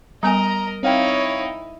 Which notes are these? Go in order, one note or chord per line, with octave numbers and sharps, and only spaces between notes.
G3 B3 A#4 D#5 G#5 A#5
C4 D#4 E4 C#5 F5 G5